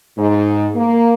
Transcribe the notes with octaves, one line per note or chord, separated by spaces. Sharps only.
G#2
A#3